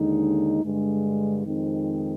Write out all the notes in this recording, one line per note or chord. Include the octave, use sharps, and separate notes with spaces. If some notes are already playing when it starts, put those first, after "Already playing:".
Already playing: D#2 D3 G#3 D#4
G2 D3 G#3
F2 D#3 G#3 C4 D#4